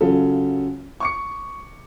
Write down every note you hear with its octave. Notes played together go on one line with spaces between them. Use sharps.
C#3 F#3 F4 A4
C#6 D6 C#7